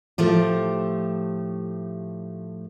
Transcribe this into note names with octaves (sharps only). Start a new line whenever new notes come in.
A2 F3 A3 G4